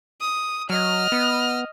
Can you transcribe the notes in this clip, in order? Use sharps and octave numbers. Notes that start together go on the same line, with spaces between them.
D#6
F#3 D#5 F6
B3